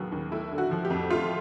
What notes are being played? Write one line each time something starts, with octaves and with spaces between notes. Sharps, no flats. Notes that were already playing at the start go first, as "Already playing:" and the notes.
Already playing: D#2 C#3 F#3 B3
D#2
A3 E4
D3
F#4
F3
G4
F2
A3 F4